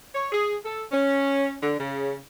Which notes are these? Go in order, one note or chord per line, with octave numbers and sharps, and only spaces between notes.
C#5
G#4
A4
C#4
D3
C#3